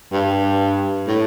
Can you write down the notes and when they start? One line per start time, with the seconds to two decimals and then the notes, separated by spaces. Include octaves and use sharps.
0.13 G2
1.08 A2